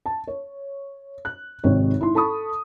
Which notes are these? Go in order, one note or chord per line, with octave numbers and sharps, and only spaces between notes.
A5
C#5
F#6
G#1 C3 D#3 G#3 C4 C#5
G#2 E4 C6
A4 A5 B5 C#6 D#6